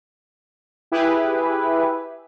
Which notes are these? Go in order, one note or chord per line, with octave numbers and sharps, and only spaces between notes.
E4 G4 G#4 B4